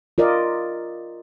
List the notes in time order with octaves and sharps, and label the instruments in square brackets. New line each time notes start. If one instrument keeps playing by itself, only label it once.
[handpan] F4 A#4 D5 D#5